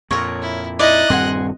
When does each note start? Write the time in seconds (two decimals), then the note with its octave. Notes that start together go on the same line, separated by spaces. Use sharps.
0.11 F2 A#2 A#4 C#5
0.42 E4
0.79 D#4 E4 D5 D#5 F#6
1.10 D#1 G2 C4 F#5 G#5 C6